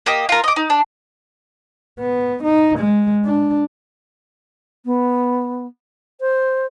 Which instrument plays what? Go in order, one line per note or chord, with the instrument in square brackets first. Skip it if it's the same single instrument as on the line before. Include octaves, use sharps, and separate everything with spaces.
[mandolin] A#3 G4 D#5
F4 A#4
D#5 D6
D#4
D4
[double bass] B3
D#4
G#3
D4
[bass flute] B3
C5